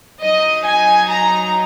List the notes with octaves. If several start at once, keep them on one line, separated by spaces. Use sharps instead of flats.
F#3 D#4 D#5
G#5
A#5